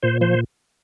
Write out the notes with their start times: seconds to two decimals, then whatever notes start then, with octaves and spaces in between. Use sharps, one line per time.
0.03 A#2 C5
0.21 F3 C5